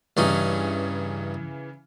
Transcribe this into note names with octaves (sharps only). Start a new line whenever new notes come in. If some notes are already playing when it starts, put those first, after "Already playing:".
G2 C#3 E3 C#4 D#4